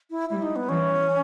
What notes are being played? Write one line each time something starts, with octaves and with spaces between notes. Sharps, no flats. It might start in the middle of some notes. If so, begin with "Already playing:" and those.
E4
G3 E4
D#4
B3
E3 C#4